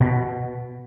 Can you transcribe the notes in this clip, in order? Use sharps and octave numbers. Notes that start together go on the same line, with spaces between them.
B2